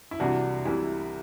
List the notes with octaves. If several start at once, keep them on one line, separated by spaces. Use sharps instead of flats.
E4
C2 C3 E3 D4 F#4
C2 C3 E3 E4 G4